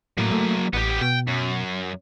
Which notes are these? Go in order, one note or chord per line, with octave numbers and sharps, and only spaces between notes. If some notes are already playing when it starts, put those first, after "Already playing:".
A2 F#3 A#3
A3
A1 B3 G4
B2 G5
F#2